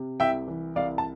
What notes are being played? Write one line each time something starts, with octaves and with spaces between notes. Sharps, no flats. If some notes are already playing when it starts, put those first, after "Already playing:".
Already playing: C3
C2 E5 G5
E3
C2 D5 F5
A5